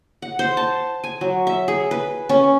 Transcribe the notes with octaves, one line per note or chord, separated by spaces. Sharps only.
F#5
C5
A5
G#5
F#3
E5
G#4
B4
C#4